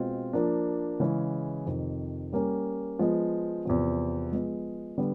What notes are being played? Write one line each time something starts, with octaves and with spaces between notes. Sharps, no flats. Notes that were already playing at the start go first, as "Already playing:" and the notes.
Already playing: B2 G#3 C4 F4
F3 A#3 D4
C#3 E3 G#3 C#4
F2 C3 D#3
G3 A#3 C#4
F3 G#3 B3
E2 C3 F3
F3 G#3 B3
D3 G3 B3